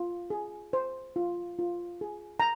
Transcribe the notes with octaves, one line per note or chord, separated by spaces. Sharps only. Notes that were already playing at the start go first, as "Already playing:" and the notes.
Already playing: F4
G#4
C5
F4
F4
G#4
A#5